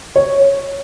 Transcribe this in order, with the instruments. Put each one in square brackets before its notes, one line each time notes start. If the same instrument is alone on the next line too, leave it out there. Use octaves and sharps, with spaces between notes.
[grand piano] C#5